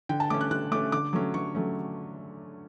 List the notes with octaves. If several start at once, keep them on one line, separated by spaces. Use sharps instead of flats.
D3 G5
A5
A3 C#4 D6
F#6
D3 F#6
A3 C#4 D6
D3 D6
F#3 A3 C#4
D3 C#6
F#3 A3 C#4